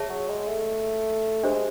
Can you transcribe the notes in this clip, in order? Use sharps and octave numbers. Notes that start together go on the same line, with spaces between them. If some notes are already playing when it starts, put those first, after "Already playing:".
Already playing: G#4 C#5 E5 A5
F#3
G#3
A3
G#3 D4 G4 C5